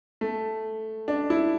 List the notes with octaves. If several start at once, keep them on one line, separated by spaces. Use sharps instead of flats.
A3
D4
E4